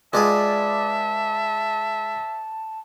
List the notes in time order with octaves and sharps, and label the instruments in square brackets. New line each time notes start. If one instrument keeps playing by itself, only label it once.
[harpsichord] G#3 F4 G#4 [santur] B4 D5 G5 [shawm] E5 [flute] A5